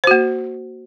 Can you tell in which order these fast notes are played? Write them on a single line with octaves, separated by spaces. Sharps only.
C5 F#4 A#3